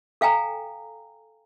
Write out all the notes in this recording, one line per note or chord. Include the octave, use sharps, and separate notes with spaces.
A4 F5 G5 G#5 A#5